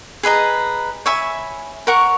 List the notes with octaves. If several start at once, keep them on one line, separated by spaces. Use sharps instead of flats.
G#4 B4 D#5 A#5
C#5 E5 G#5 B5
A#4 C#5 F#5 C#6